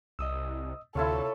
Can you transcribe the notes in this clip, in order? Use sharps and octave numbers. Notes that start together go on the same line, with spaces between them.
C2 D#5 D#6 E6
D2 C3 E4 F4 A4 C#5 A5